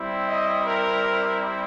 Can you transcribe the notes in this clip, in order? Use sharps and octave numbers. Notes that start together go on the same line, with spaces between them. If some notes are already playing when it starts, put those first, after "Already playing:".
Already playing: G3 C4 E4
D#5
A#4